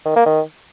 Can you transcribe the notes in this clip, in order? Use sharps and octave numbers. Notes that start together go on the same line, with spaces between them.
D#3
A#3
D#3